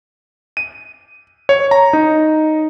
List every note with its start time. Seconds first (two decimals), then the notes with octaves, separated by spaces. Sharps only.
0.57 D#7
1.49 C#5
1.71 A#5
1.93 D#4